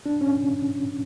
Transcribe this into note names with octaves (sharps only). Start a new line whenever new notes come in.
D4
C#4